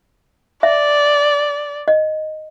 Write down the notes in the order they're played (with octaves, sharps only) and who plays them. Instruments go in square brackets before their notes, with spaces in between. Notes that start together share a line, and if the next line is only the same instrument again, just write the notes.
[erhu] D5 [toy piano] E5
[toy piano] D#5